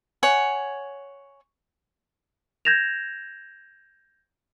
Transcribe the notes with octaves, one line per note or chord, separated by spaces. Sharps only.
C#5 F#5 G#5
G6 G#6 A#6 E7 F7